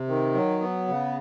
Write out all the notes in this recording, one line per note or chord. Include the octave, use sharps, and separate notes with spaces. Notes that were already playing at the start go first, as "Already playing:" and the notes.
Already playing: C3
D#3
F#3
B3
C#3